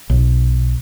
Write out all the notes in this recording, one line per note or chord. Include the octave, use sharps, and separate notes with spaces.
B1